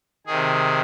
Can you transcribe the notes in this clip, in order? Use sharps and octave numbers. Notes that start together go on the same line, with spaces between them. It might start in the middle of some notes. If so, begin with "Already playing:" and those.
C3 D#3 G#4